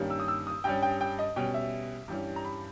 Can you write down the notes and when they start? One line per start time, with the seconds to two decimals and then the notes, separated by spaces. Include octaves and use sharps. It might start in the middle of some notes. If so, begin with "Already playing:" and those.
Already playing: G2 D#3 G3 A#3 C#4
0.10 E6
0.20 D#6
0.28 E6
0.47 D#6
0.64 G2 G3 C#4 G5
0.82 G5
1.01 G5
1.19 D#5
1.36 B2 G3 C#4 G5
1.54 E5
2.08 G2 E3 G3 C#4
2.36 A#5
2.45 B5